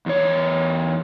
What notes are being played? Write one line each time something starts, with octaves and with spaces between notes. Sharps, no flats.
E2 C#5